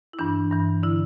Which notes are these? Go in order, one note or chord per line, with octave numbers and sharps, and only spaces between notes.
E4
G2 E3 D4
G2 E3
D3 E4